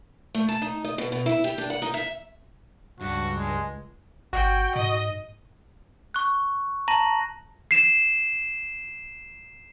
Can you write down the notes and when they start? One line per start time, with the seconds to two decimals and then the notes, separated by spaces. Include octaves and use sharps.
0.35 A3
0.49 A5
0.62 D#4
0.85 D#5
0.98 B2
1.12 B2
1.26 E4
1.44 G4
1.58 D4
1.70 F#5
1.82 D#4
1.94 E5
3.01 C#2 G2 F#4
3.37 G#3
4.33 G1 F#4 G5
4.76 G#2 D#5
6.14 C#6 F#6
6.88 A5 A#5 A#6 F#7
7.71 C7 E7